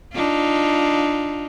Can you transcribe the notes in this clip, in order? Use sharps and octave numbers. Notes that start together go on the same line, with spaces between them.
D4 D#4 F4